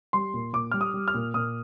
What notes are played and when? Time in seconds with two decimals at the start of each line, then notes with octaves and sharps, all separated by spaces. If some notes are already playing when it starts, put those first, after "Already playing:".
0.13 G3 C6
0.34 A#2
0.53 A#2 D6
0.72 G3 F6
0.81 D#6
0.94 G3
1.08 F6
1.14 A#2
1.34 A#2 D#6